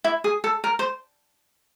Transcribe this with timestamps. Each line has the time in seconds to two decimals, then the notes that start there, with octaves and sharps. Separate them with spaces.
0.04 E4
0.24 G#4
0.44 A4
0.64 A#4
0.79 C5